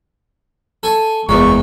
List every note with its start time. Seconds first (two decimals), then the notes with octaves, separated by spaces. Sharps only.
0.83 A4 G#5 C#6
1.29 F#1 E2 G#3 A#3 C#6